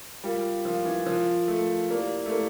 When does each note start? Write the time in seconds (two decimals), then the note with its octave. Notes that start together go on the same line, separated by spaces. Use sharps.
0.24 G3 F4 A#4 F5
0.65 F3 F4 A#4 F5
0.85 E3
1.06 F3 F4 A#4 F5
1.48 A3 F4 A#4 F5
1.91 A#3 E4 G4 D5 F5
2.26 A3
2.32 A#3 E4 G4